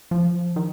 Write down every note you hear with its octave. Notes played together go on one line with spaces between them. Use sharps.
F3
D#3